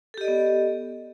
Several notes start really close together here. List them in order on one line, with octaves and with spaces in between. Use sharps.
A4 G4 D#5 D5 B3